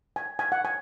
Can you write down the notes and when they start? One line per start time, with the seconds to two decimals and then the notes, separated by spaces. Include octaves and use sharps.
0.16 G#5
0.39 G#5
0.52 F#5
0.65 G#5